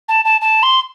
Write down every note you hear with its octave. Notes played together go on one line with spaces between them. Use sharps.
A5
A5
A5
C6